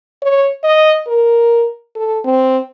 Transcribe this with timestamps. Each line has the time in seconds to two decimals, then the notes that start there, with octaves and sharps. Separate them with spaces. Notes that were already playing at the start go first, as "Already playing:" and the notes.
0.22 C#5
0.64 D#5
1.07 A#4
1.96 A4
2.25 C4